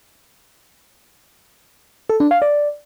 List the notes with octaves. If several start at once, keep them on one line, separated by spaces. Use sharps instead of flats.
A4
D4
F5
D5